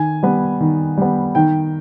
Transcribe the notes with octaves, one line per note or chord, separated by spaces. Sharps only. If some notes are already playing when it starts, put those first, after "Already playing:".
Already playing: D#3 G#5
G3 B3
D#3
G3 B3
D#3 G5